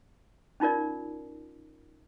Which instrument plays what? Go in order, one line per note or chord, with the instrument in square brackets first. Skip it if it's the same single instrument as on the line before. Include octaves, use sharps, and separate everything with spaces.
[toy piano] C#4 D#4 F4 A#4 D5